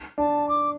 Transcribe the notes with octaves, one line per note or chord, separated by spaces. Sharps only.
D4 A5
D6